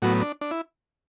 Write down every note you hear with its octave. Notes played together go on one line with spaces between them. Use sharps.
A2 F#3 B3 F#4
D4
D4
E4